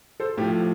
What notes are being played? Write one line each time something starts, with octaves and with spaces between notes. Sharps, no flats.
A4 C5
A2 F3 G4